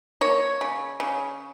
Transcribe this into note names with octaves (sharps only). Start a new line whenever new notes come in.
A#3 C#5
C#3
C#3